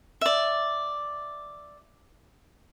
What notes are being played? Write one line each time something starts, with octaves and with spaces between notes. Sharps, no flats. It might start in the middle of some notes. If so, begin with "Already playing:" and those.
D5 E5